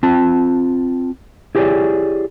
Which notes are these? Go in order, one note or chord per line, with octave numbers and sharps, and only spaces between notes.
C4 F4 A5
E4 G4 G#4 B4 C#5 D5